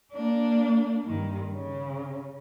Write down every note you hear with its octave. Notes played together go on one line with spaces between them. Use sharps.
A#3 D4
G2 D#3
C#3